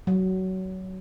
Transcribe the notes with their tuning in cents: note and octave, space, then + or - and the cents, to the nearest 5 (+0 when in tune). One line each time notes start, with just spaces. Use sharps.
F#3 +20